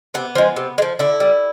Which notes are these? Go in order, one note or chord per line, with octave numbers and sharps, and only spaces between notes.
C3 B3
F3 G#3
C3
G#3
F3
D3 E4
G3